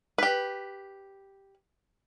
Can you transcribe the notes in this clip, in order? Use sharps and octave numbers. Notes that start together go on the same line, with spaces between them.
G4 B4